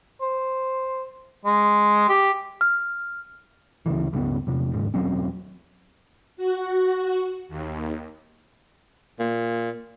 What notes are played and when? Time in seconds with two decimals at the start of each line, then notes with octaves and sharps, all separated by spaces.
0.21 C5
1.45 G#3
2.09 G4
2.61 F6
3.86 D2 C#3 E3
4.13 C#2 G2 C#3 B3
4.47 E2 C3
4.72 D#2 G#2 C#3
4.94 E1 F#3 C4 C#4
6.37 F#4
7.49 D#2
9.19 A#2